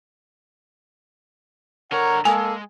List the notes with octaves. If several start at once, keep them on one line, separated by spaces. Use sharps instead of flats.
D3 A#4 C#5 F#5 A#5
G#3 A#3 A4 G#5